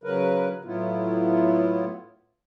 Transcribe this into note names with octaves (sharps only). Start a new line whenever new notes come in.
C#3 F#3 A#4 B4
A2 F#3 B3 E4 F4